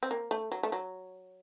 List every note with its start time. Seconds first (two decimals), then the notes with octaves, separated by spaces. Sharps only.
0.03 C4
0.11 A#3
0.31 A3
0.52 F#3
0.63 A3
0.72 F#3